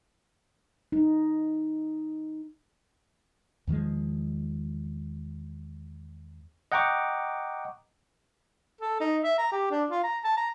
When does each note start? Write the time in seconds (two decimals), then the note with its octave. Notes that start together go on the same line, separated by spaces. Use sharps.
0.92 D#4
3.67 E2 D#3 F3 G#3
6.72 D#5 F#5 G5 A#5 C#6 D6
8.81 A4
9.00 D#4
9.24 E5
9.38 A#5
9.52 G4
9.71 D4
9.90 F4
10.04 A#5
10.24 A5
10.37 A#5